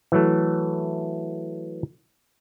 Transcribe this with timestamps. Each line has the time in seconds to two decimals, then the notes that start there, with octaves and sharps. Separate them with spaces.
0.12 E3 F#3 A3